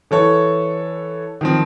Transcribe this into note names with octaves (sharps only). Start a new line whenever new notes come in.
E3 A4 C#5
D#3 F3 C4